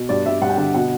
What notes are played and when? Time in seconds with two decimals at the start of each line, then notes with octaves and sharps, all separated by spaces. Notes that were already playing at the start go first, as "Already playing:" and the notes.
Already playing: B2
0.09 G2 D5
0.25 G2 E5
0.41 G2 F#5
0.49 G5
0.57 D3 F#5
0.74 B2 F#5